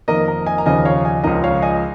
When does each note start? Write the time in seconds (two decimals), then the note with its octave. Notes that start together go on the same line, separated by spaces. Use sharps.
0.08 F2 D#3 A#3 A#4 D#5
0.28 A#4
0.47 D#5 G#5
0.58 A#5
0.66 D#2 C#3 F3 D#5 G#5
0.85 C#5 F5
1.05 D#5 G#5
1.23 C#2 C#3 F3 A#4 D#5
1.44 C#5 F5
1.62 D#5 G#5